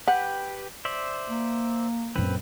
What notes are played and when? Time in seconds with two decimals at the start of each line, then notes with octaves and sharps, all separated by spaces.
0.08 G4 B4 F#5 G5
0.85 C5 D5 E5
1.30 A#3
2.16 A#1 F#2 C4 B4